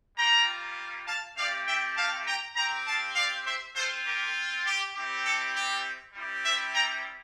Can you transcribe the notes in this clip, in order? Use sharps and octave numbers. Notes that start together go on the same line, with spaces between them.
G3 A#3 F4 G5 A#5
F5 A5
A3 C4 G4 D5 F5
E5 G5
F5 A5
G5 A#5
C4 G4 G5 A#5
F5 A5
D5 F5
C5 E5
C4 F4 A4 C5
G4 A#4
G4
G3 C4 E4 G4
A4
G4
G3 C4 E4 G4
C5 E5
G5 A#5